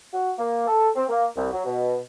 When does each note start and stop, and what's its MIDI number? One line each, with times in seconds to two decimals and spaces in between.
0.13 0.31 66
0.38 0.65 58
0.67 0.90 69
0.96 1.04 60
1.09 1.26 58
1.36 1.50 36
1.52 1.62 54
1.65 1.96 47